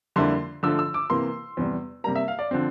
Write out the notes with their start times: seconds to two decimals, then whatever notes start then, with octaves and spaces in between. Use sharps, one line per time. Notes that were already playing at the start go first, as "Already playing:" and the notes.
0.16 F2 D3 G3 A#3 E4 C6
0.63 D3 F3 A3 E6
0.79 E6
0.94 D6
1.10 C3 E3 A#3 C6
1.57 E2 C3 G3
2.04 C3 G3 A#3 A#5
2.15 E5
2.28 F5
2.39 D5
2.51 D3 F3 C4